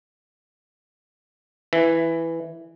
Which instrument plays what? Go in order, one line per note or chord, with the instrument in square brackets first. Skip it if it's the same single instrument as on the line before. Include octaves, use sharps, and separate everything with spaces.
[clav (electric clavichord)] E3